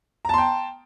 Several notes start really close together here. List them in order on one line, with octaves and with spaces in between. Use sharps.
A#5 A5 C6 G5